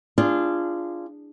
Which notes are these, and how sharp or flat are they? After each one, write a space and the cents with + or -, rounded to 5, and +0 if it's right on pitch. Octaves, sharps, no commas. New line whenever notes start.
D4 +0 F4 -20 G#4 -15